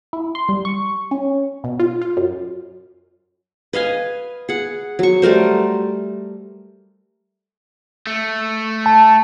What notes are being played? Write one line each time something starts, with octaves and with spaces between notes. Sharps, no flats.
E4
C6
G3
C#6
C#4
B2
F4
F4
F#2
B4 D#5 F5 G#5
G#4 F#5
F#3 C#6
G3 A3 A#4 C5
A3
A5